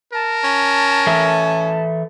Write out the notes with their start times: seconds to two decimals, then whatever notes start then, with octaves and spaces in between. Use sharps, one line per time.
0.13 A#4 A5
0.44 C#4
1.07 E3 A4 E5